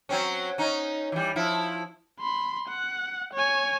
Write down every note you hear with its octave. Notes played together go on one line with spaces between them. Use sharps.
F#3 C4 C#4
C#4 D#4
E3 G3
F3 E4
B5 C6
F#5
C#5 G#5